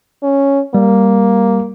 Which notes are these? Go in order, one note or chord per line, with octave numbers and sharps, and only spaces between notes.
C#4
G3 A#3